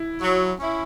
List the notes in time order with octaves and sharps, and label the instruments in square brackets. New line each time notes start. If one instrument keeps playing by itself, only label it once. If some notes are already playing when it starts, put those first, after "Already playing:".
Already playing: [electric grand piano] E4
[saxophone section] F#3
C#4 E4